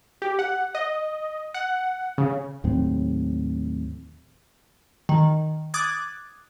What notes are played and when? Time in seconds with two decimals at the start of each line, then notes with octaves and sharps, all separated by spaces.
0.22 G4
0.39 F#5
0.75 D#5
1.54 F#5
2.18 C#3
2.64 D#2 A2 F#3 C4
5.09 D#3
5.74 D6 D#6 F#6 G#6 A6